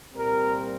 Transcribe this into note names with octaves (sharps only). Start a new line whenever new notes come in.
C2 A#2 G3 C4 A#4